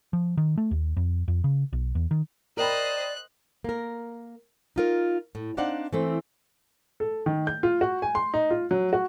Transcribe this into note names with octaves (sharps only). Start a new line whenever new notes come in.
F3
D#3
A3
D#2
F2
F2
C#3
B1
E2
D#3
A#4 C5 D5 D#5 G5 B5 F#6
A#3 A#4
D#4 F4 A#4
A2
C4 D4 D#4 D5 F5 F#5
E3 A3 C4
A4
D#3
G6
F4
F#4
G#5
C6
D#4
F4
F#3
F#4